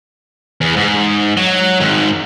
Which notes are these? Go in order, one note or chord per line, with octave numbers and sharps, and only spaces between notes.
E2
G#2
F#3
G#2 D#3